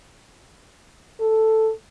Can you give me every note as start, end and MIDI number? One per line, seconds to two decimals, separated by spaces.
1.20 1.71 69